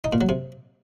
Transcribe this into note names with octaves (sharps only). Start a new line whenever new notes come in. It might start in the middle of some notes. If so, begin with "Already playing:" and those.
D#4
A#2
F#3
C3